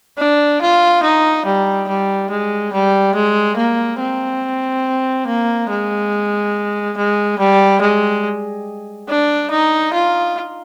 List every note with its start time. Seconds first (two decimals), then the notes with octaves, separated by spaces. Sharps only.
0.18 D4
0.61 F4
1.03 D#4
1.46 G3
1.88 G3
2.30 G#3
2.73 G3
3.15 G#3
3.57 A#3
4.00 C4
5.27 A#3
5.70 G#3
6.97 G#3
7.39 G3
7.81 G#3
9.09 D4
9.50 D#4
9.93 F4